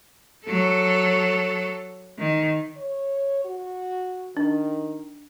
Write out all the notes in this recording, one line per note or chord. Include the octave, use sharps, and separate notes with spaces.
F#3 A4
D#3
C#5
F#4
D#3 D4